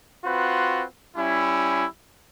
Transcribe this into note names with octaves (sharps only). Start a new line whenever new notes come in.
C4 F4 F#4 B4
G3 C#4 E4